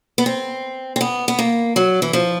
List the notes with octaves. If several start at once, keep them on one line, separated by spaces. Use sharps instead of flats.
B3
C4
C4
B3
B3
A#3
F#3
E3
F3